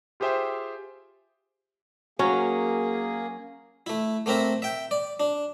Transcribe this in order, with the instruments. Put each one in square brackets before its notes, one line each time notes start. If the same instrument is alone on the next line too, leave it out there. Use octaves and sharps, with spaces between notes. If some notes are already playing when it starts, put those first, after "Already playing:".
[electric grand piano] F4 G4 G#4 C5 E5 G5
[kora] F#3 C#4 [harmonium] A#3 G#4
[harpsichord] A3 E4
A3 A#3 C4 A#4 E5
E5 G5
D5
D4